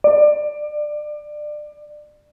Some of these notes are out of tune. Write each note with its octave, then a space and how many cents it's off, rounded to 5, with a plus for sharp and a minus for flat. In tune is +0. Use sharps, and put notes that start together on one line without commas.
D5 +25